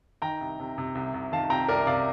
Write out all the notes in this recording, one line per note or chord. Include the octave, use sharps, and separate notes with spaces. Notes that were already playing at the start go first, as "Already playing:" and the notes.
D#3 G5 A#5
C2
C3
C3
C2
C2
D#3 F5 A5
C3 G5 A#5
C2 A#4 D5
C3 D5 F5